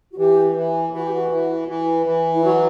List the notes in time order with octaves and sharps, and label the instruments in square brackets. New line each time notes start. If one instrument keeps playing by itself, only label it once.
[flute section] F#4
[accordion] E3 [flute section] G4
[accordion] E3
[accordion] E3 [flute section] F#4
[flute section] G4
F#4
[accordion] E3
E3
E3
[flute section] E4
[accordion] F#3 [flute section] F#4